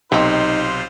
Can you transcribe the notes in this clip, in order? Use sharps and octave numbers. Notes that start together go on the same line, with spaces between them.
B1 C3 D#3 C4 D#4 F4 C5